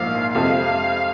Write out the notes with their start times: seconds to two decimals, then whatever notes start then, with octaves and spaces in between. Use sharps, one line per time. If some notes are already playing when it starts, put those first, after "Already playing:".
Already playing: A#1 G#2 F3 A#3 D#4 F5
0.34 F2 C3 F3 G#3 F5